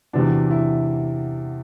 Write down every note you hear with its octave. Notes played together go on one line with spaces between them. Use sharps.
E2 C3 E3 D4 F#4
E4